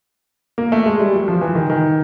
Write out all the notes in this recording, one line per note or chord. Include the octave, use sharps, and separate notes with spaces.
A#3
A3
G#3
G3
F#3
F3
E3
D#3
D#3